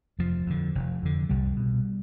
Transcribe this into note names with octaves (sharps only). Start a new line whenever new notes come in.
F1 F3
F2 D3
F1
F2 D3
C2 G3
B2